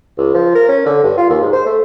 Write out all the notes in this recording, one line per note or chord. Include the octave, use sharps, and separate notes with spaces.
C#2
F3
A#4
C#4
D3
G2
F4
D#2
G#2
C5
A3